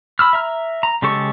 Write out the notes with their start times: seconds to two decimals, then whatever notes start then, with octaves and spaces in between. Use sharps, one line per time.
0.19 B5 E6 F6
0.33 E5 A#5 F6
0.83 A#5
1.02 C#3 G#3 G4 A4 C#6